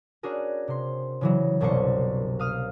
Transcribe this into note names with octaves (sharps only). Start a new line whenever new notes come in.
C#4 D4 F#4 G#4 A#4
C3 C6
C#3 E3 F#3
F#1 C2 B2 D4 C5 C#6
F5 D#6 F6